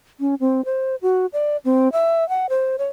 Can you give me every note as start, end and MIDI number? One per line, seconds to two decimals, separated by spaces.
0.20 0.35 61
0.40 0.64 60
0.65 0.96 72
1.02 1.26 66
1.33 1.57 74
1.65 1.89 60
1.92 2.27 76
2.29 2.46 78
2.49 2.76 72
2.78 2.87 73